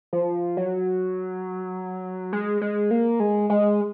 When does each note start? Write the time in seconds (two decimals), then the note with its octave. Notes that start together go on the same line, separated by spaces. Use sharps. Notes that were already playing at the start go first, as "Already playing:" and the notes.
0.13 F3
0.57 F#3
2.33 G#3
2.61 G#3
2.91 A#3
3.20 G#3
3.50 G#3